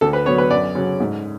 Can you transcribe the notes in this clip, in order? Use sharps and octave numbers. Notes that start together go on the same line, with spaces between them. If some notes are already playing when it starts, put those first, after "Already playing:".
D2 A4
B4
D3 F#3 B3 C#5
B4
F#2 D5
C#3 F#3 C#4
G#2